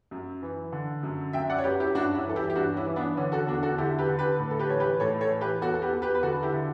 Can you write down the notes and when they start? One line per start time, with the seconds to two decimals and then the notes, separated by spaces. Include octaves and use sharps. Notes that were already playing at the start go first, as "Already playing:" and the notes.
0.11 F#2
0.42 E3
0.72 D3
1.03 F#2
1.33 F#2 E5 G5
1.49 D5 F#5
1.59 C#5
1.64 F#2 G4 B4
1.80 E4 G4
1.94 G2 D4 F#4
2.15 C#4 E4
2.26 E3 A4
2.36 E4 G4
2.50 G4
2.55 G2 D4 F#4
2.76 C#4 E4
2.86 E3
2.96 B3 D4
3.17 D3 C#4
3.32 F#4 A4
3.47 E2 D4 F#4
3.63 F#4 A4
3.78 D3 E4 G4
3.99 G4 B4
4.08 D3
4.19 G4 B4
4.39 A2
4.51 A4
4.59 G4 B4
4.70 E3 C#5
4.80 G4 B4
5.00 A2 A4 C#5
5.21 A4 C#5
5.31 E3
5.41 G4 B4
5.61 E2 F#4 A4
5.74 A4
5.82 G4 B4
5.93 E2
6.02 G4 B4
6.15 B4
6.23 D3 F#4 A4
6.43 E4 G4
6.53 D3